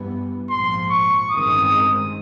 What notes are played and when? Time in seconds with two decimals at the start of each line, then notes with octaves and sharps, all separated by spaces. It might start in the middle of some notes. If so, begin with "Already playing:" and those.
Already playing: G2 E3 G3 B3
0.49 A#1 G#2 F3 C6
0.90 C#6
1.31 A1 G2 D#3 G#3 C4 D#6